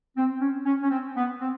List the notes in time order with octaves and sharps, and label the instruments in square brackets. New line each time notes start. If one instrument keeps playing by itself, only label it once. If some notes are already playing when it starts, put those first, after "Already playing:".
[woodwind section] C4
C#4
C#4
C#4
C4
B3
C4